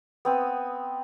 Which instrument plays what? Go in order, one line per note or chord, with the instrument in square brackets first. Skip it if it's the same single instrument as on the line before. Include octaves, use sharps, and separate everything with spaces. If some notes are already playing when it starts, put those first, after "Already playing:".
[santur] B3 C4 D#6